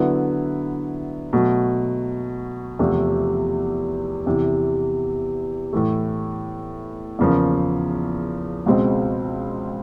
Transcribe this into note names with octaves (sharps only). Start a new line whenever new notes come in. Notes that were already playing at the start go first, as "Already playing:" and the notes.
Already playing: D3 F#3 B3 E4
B2 F#3 A3
E2 C3 F3 A3
E2 C3 E3
A2 E3 A3
E2 C#3 F3 A#3
C#2 B2 G#3 C4